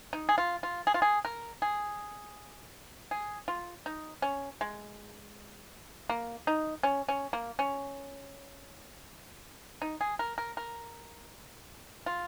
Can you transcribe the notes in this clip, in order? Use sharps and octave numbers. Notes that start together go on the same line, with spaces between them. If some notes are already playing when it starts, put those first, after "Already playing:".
D#4
G#4
F4
F4
G#4
F4
G#4
A#4
G#4
G#4
F4
D#4
C#4
G#3
A#3
D#4
C#4
C#4
A#3
C#4
D#4
G#4
A#4
A#4
A#4
F4